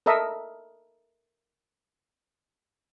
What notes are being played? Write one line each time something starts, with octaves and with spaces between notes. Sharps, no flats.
A4 A#4 D#5 E5